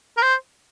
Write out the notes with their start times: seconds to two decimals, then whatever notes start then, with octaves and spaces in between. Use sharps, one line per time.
0.17 A#4
0.22 C5